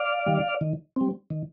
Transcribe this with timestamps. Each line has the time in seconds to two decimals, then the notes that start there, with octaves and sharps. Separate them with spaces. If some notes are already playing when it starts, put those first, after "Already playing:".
Already playing: D5 F5
0.26 D#3 G3
0.61 D#3
0.96 G3 C4
1.30 D#3